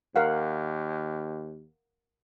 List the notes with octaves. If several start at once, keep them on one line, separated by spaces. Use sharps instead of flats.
D#2 A#4 F5 F#5